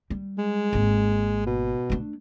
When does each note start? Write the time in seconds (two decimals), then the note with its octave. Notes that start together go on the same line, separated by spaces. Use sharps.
0.10 G3
0.38 G#3
0.73 G#1 A#3
1.46 B2
1.90 A3 D4